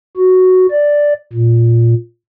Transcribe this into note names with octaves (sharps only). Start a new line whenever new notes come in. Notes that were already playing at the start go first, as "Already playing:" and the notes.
F#4
D5
A#2